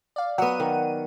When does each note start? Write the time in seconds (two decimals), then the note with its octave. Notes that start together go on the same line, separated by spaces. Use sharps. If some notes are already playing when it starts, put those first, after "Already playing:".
0.16 D5 F5
0.38 F#3 B3 F#5 D#7
0.60 D#3